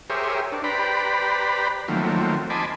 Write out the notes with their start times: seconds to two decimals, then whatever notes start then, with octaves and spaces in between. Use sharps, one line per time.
0.10 G4 G#4 A#4 C5 C#5 E5
0.52 D4
0.64 G4 B4 C5 D5 A#5 B5
1.88 D#3 F3 F#3 A3 A#3 C4
2.50 D#5 G#5 A5 B5 C6 D6